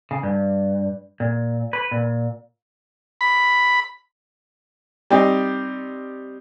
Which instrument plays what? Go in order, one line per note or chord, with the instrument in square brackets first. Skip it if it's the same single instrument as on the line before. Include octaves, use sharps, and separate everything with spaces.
[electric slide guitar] C#3
G2
A#2
B4
A#2
[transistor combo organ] B5
[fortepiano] G3 C4 D#4